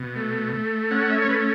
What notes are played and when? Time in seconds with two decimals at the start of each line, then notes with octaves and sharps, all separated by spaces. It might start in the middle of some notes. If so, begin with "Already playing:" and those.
Already playing: B2
0.16 A3
0.53 A3
0.91 C#4 F#5
1.01 F#5
1.10 E5
1.22 C#5
1.29 A3 B4